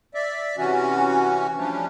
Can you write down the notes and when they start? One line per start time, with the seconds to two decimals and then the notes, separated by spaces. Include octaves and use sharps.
0.14 D5 E5
0.58 C3 E3 C#4 F#4
1.57 F3 G3 A3 C#4 D4